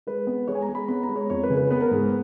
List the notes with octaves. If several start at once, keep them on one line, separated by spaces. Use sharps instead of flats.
G#3 B4
B3
G#3 C#5
G#5
A#5
G#3
B5
B3 B5
A#5
G#3
C#5
F2 C#5
B4
C#3
B4
B3 B4
A#4
G#2 G#4